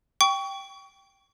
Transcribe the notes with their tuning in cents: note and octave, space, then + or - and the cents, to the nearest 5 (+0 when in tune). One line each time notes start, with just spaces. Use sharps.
G5 +0 C#6 +30